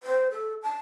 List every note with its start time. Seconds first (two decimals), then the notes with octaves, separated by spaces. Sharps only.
0.03 C5
0.31 A4
0.63 A5